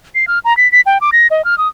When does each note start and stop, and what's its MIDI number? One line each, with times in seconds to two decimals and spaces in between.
0.15 0.25 96
0.27 0.39 89
0.45 0.56 82
0.57 0.70 95
0.72 0.81 95
0.86 0.98 79
1.01 1.10 86
1.12 1.27 94
1.30 1.44 75
1.45 1.57 89
1.58 1.68 87